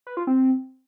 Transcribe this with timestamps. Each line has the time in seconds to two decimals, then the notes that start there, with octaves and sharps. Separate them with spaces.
0.07 B4
0.17 F4
0.27 C4